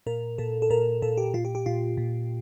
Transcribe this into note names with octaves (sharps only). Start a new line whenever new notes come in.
A#2 A#4
A#2 A4
A4
A#2 A#4
A#2 A4
G4
A#2 F4
G4
G4
A#2 F4
A#2